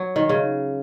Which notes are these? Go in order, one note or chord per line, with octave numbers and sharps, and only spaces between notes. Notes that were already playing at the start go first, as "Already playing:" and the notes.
Already playing: F#3
D#3
C#3